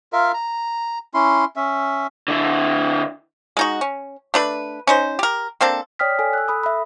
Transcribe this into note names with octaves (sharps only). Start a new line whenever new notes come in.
F4 A#4 E5 F5
A#5
C#4 E4 C6
C#4 E5
D3 E4
G#3 D#4 F#4
C#4
A3 D4 B4
C#4 D#4 C5
G4 A#4
A#3 C4 D4 A4
C#5 D5 G5 D#6 F6 B6
A4 G#5
E6 F#6
A4 B5 D#6
E5 B5